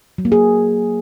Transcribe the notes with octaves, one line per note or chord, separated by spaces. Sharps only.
F#3
A#3
G#4